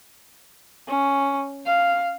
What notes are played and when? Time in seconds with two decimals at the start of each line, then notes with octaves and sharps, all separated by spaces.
0.88 C#4
1.66 F5